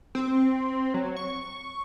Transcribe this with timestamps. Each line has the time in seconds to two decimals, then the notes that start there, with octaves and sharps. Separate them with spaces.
0.15 C4
0.94 F#3
1.17 C#6